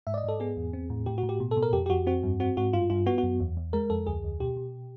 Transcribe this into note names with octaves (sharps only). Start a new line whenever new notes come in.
G#2 E5
D5
D#5
G#2 A4
B3 G#4
E2
C4
A2
A2 G4
F#4
A2
G4
B2
A4
B2
A#4
F2 G4
G4
F2 F#4
C4 F#4
G2
C4 F#4
G#2 F#4
G2 F4
G2 F4
B3 F#4
F#4
F#2
E2
E2
G#3 A#4
F2 A4
D2 G#4
D2
B2 G4
B2